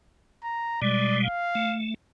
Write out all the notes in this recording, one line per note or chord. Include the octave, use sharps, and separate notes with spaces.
A#5
B2 G3 G#3 D5
F5
A3